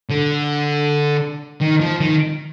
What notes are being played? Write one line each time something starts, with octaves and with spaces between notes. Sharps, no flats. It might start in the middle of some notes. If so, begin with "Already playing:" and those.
D3
D#3
F3
D#3